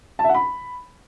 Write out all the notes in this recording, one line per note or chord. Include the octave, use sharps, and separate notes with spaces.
A5
E5
F#5
B5